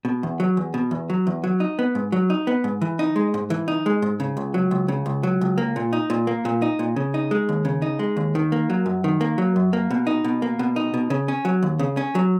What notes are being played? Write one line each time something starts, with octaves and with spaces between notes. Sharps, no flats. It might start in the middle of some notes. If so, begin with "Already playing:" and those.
B2
E2
F#3
E2
B2
E2
F#3
E2
F#3
D#4
B3
G#2
F#3
D#4
B3
G#2
E3
D#4
G#3
G#2
E3
D#4
G#3
G#2
C#3
C#2
F#3
C#2
C#3
C#2
F#3
C#2
A#3
A#2
D#4
A#2
A#3
A#2
D#4
A#2
C#3
D#4
G#3
D#2
C#3
D#4
G#3
D#2
D#3
A#3
F#3
F#2
D#3
A#3
F#3
F#2
A#3
B2
D#4
B2
A#3
B2
D#4
B2
C#3
C#4
F#3
D#2
C#3
C#4
F#3